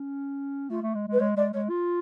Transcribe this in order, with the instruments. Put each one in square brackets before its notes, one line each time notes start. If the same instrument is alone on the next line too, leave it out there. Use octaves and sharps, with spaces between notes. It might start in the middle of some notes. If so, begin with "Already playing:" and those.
Already playing: [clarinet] C#4
[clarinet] A3 [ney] F4
[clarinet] A3
G#3
G#3
[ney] B4
[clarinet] G#3 [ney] C#5
[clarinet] G#3 [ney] D5
[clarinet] G#3 [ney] C#5
[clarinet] F4